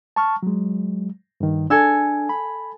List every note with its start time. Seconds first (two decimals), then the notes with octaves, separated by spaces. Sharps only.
0.16 A5 C#6 F6
0.43 F#3 G#3
1.40 G2 D#3
1.70 D4 A4 G#5 E6
2.29 B5